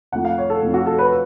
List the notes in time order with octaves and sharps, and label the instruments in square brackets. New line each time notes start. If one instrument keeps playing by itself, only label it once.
[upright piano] F2 F3 A3 F#5
F5
C#5
A4
F2 F3 A3
F#4
A4
B4